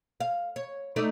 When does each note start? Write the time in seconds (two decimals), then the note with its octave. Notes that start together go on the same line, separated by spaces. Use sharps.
0.20 F5
0.56 C#5
0.96 A3 D#4 D5